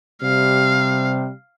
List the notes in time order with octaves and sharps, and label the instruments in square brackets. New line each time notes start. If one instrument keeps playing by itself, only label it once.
[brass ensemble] C3 G3 [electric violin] F5